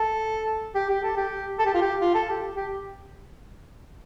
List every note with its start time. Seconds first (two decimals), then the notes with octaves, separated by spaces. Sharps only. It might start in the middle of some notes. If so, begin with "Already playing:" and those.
Already playing: A4
0.75 G4
0.89 G4
1.03 A4
1.17 G4
1.59 A4
1.66 G4
1.74 F4
1.81 G4
2.00 F4
2.14 A4
2.29 G4
2.56 G4